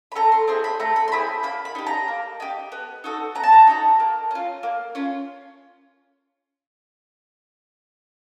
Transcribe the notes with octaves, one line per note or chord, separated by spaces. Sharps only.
B5
A3 A#5
C6
C4 E4 G#4 C6
B5
A3 A#5
B5
C6
C4 E4 G#4 B5
A#3 B5
B5
D#4 G4
A#5
A#3
D#4 G4
B3
D#4 F#4 A4
B3 A#5
A5
A#5
D#4 F#4 A4
A#3
C#4 F4
A#3
C#4 F4